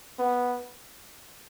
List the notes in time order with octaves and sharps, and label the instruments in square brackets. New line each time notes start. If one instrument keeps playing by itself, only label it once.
[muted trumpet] B3